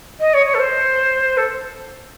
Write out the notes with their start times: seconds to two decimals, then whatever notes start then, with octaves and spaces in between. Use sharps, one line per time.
0.20 D#5
0.33 C#5
0.45 C#5
0.54 A4
0.59 C5
1.37 A4